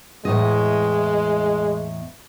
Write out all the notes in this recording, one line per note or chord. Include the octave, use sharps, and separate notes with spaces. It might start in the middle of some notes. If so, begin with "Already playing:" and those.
E2 A2 G#3 D#5